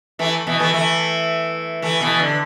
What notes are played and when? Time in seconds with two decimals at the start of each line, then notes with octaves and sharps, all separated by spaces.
0.19 E3 A3
0.47 B2 E3
0.59 E3 A3
0.74 E3 A3
1.82 E3 A3
2.01 B2 E3
2.19 D3